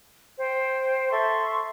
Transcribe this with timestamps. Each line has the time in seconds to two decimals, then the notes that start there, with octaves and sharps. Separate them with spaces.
0.38 C5 G5
1.10 A4 E5 C6 C#6